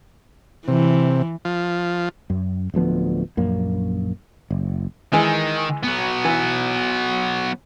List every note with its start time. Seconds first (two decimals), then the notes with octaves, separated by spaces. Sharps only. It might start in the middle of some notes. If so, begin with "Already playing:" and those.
0.68 C3 E3
1.45 F3
2.30 F#2
2.74 D1 D2 F3 B3
3.37 A#1 F#2 A#3
4.51 F#1
5.13 D#3 E3 G#3
5.83 F#3 B3
6.25 E3